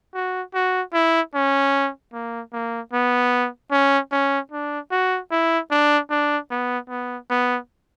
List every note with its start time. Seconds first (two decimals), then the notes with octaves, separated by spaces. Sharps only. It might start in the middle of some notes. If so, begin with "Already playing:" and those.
0.15 F#4
0.54 F#4
0.93 E4
1.34 C#4
2.13 A#3
2.53 A#3
2.93 B3
3.71 C#4
4.12 C#4
4.51 D4
4.91 F#4
5.31 E4
5.71 D4
6.10 D4
6.50 B3
6.89 B3
7.30 B3